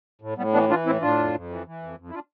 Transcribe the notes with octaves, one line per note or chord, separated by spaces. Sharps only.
A2
A2 G3 B3
E3 B3 D4
E3 D4 F4
A2 C4 E4
A2 D4 F4
F2
F2
E3
E3
F2
F2
E4
D4 F4